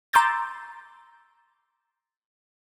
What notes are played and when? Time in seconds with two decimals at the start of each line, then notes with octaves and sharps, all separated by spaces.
0.13 A#5 C6 D6 E6 G6 A6